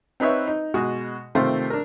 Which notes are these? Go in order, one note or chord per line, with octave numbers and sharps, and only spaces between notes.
C4 D#4 B4 C#5 E5
D#4
B2 G#3 F#4 D#6
C3 D#3 A3 C4 F4 C5
D4 A#4